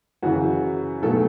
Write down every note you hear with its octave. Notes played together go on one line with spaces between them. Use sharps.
F#2 C#3 E3 F#4
B1 B2 F#3 A3 A4